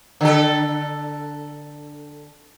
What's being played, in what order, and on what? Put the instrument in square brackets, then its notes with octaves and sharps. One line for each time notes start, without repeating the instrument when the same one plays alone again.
[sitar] D3 A4